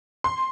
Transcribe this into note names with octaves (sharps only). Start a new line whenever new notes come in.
C6